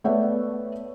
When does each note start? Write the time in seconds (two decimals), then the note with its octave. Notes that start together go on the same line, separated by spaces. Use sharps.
0.04 A3 B3 C#5 D5 E5